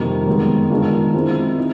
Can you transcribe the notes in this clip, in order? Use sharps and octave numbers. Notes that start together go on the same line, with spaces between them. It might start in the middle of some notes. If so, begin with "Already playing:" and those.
Already playing: F2 C3 D#3 G3 A#3
F#2 D#3 G#3 B3
D#3 G#3 B3 D4 F4
F3 G#3 C4 E4
D#4